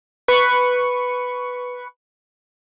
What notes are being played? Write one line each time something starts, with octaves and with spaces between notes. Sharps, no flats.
B4 C#6